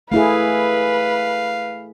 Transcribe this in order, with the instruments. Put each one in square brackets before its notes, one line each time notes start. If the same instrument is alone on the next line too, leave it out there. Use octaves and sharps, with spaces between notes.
[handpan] A3 E4 G#4 [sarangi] B4 [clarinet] F5